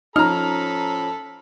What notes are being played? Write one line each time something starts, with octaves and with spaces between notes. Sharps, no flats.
F3 C#4 D#4 A4 A#5 B5 F6